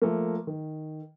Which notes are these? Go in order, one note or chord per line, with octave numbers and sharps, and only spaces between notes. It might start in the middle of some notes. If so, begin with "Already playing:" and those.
F3 A3 A#3
D#3